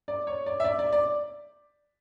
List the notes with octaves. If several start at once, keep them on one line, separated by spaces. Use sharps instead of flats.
D5
C#5
D5
E5
D5
D5
D5